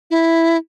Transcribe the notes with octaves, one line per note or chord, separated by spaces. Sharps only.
E4